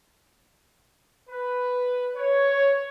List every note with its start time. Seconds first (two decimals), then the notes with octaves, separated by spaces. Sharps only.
1.30 B4
2.16 C#5